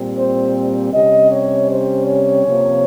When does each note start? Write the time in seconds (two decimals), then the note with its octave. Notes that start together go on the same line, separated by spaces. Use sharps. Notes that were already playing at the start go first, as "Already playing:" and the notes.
Already playing: A#2 G3 C4
0.16 C5
0.92 C3 G3 C#4 D#5
1.30 C#5
1.69 C5
2.06 C#5
2.44 C3 F3 A#3